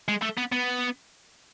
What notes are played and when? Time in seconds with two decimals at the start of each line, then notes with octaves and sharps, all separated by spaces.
0.08 G#3
0.22 A3
0.37 B3
0.52 B3